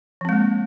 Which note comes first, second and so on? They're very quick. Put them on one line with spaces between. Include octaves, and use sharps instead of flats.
F3 C4 G#3 A#3